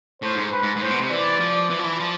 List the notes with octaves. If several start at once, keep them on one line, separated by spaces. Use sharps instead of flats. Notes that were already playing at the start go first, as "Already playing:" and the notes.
A2 C5
G#2
B4
G#2
G#2
A2 C5
B2
C3
E3 D5
F3
E3
F3
E3
F3